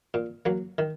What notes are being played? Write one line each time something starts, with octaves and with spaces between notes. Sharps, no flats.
A#2
F#3 A#3
D#3